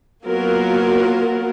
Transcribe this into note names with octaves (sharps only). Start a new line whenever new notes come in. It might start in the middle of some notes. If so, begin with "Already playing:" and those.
F#3 A#3 B3 F4 F#4 A#4